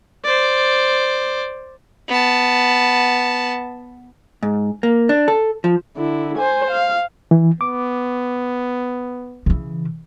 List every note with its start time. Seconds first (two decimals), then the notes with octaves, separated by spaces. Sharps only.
0.25 C5 D5
2.08 B3 A5
4.43 G#2
4.83 A#3
5.09 D4
5.28 A4
5.64 F3
5.97 D3 E4
6.38 C5 G#5
6.71 F5
7.31 E3
7.61 B3 D6
9.46 C#3 E3